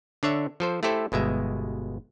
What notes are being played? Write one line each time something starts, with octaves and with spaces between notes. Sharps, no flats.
D3 D4 C#5 E5
F3 A4 C5
A3 E4 G4 A4 C5
G1 B2 G#3 E5